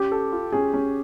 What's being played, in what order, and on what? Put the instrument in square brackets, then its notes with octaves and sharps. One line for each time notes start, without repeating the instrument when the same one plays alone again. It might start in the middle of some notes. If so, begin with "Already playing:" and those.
Already playing: [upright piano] C#4 [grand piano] G4
[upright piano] A4
F4
[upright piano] C#4 [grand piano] G#4
[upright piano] C#4